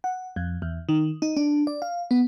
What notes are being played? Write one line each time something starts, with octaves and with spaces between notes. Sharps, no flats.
F#5
F2
E2
D#3
D#4
D4
D5
F5
B3